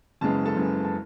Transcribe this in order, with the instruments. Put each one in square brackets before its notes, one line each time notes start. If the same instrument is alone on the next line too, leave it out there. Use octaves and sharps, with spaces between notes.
[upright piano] F#1 F#2 C#3 G#3 B3 A5
A4 A5
F#1 F#2 C#3 G#3 B3
A5